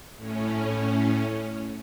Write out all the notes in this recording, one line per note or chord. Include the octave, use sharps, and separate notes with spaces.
A2 C#4